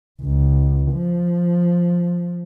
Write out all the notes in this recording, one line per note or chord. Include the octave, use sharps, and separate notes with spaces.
C#2
F3